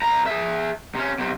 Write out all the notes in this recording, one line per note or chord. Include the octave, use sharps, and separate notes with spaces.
C2 A#5
G#4 E5
C3 C#4
B1 C3